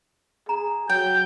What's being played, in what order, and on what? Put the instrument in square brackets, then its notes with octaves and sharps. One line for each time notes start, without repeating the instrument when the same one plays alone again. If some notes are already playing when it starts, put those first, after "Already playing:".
[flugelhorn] G#4 [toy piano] A#5
[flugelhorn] F#3 [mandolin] G5 [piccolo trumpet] G6